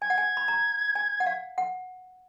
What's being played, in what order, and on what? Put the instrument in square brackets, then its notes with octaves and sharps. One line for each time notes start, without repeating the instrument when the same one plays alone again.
[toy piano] G#5 [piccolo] G#6
[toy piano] F#5
G#5
B5
A#5
G#5
F#5
F5
F#5